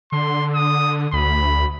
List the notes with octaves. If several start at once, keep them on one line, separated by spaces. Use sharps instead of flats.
D3 C6
D#6
D2 B5